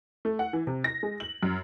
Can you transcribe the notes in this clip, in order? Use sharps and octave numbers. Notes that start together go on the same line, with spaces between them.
A3
F#5
E3
C3
A#6
G#3
F#7
F#2